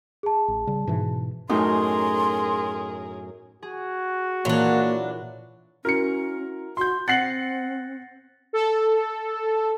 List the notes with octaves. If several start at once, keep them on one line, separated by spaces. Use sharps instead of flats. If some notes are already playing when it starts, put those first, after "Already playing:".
G#4 A5
A1
C#3 G3
G#2 B2 E3
F#2 A2 D#4 G#4 A#4 C6
F#4 G#4
A#2 E3 F#3 A#3 D4
C#4 E4 F#4 A#4 C#7
F#4 C6 G6
C4 F#5 A6 A#6 C7 C#7 F#7
A4